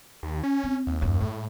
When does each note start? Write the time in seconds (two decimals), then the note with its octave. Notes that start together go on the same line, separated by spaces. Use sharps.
0.23 D#2
0.44 C#4
0.64 C4
0.87 D#2
1.02 D#1 F#2
1.21 A2 G#3